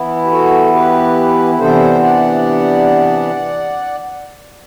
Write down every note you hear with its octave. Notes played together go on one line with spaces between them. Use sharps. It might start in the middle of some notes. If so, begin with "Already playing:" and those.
Already playing: E3 B3 E4
G4
F#4 A4
G4 B4
C3 E3 B3 D4 A4 C5
D5 F#5